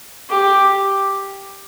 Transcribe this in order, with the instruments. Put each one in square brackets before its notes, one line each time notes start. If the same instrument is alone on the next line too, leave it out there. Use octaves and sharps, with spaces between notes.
[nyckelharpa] G4